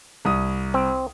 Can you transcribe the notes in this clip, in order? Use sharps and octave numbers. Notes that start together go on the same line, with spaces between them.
C2 D#6
C4